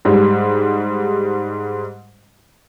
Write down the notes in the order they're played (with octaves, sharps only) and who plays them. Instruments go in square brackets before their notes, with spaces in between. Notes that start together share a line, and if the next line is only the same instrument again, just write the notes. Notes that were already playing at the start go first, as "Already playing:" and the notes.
[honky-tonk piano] G#2 G3